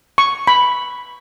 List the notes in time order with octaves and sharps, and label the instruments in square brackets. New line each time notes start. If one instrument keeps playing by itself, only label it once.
[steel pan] C#6
B5